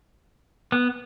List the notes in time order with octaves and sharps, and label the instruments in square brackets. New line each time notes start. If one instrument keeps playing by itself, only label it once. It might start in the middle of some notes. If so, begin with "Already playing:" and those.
[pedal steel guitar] B3